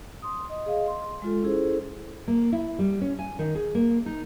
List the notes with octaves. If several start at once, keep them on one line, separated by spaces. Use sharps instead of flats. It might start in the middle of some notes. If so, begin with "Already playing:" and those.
C6 D#6
D#5
G#4 D#5 F5
C6
G#3 F4 A4
C#4 E4 G#4 A4 C5
A#3
E4
G3
C#4
G#5
D#3
G#4
A#3
D#4